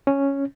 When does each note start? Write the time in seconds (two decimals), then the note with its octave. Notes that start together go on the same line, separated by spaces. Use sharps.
0.07 C#4